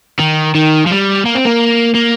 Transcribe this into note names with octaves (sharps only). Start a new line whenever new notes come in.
D#3
D#3
F3
G3
A#3
C4
A#3
A#3